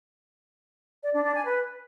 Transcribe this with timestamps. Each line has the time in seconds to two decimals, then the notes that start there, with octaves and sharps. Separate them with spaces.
1.03 D5
1.14 D4
1.24 D4
1.35 G#5
1.45 B4